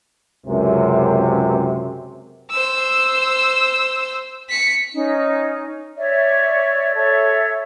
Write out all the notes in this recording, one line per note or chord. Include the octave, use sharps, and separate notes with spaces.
C#2 F#2 C3
C5 E6
B6 C#7
C#4 D#4
C#5 D5 E5
A4 C#5 E5